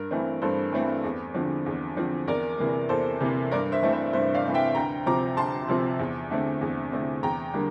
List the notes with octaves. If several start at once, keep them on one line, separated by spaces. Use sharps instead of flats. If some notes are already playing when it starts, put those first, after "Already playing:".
Already playing: G2 A#4
E3 A3 C4
G2 A4 C5
E3 A3 C4
E2
D3 F3 C4
E2
D3 F3 C4
E2 A#4 D5
C3 E3 A#3
E2 A4 C5
C3 E3 A#3
G2 A#4 D5
C5 E5
E3 A3 C4
C5 E5
G2 C5 E5
D5 F5
E3 A3 C4
E5 G5
D2 G5 A#5
C3 F3 C4 A#5 D6
D2 A5 C6
C3 F3 C4
E2
D3 A3 C4
E2
D3 A3 C4
E2 G5 A#5
D3 G3 A#3